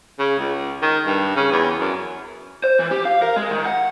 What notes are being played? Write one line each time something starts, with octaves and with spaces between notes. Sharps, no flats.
C#3
C#2
D#3
G2
C#3
E2
F#2
C5
E3
G4
F5
A#4
G#3
D#3
F#5